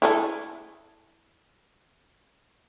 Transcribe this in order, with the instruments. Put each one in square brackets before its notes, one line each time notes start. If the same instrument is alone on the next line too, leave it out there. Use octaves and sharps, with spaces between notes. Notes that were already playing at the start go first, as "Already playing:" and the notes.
[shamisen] E4 G#4 A4